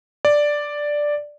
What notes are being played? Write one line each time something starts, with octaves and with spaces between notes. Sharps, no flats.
D5